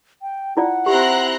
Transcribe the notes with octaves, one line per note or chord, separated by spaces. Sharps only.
G5
E4 F4 D5 F#5
C4 E4 G4 A#5 C6 F#6